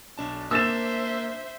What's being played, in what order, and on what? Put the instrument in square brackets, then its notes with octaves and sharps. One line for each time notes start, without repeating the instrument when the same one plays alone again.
[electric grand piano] B1 D4 A5
[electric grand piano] A#3 D4 [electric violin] C5 E5 [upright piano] E6 A6 E7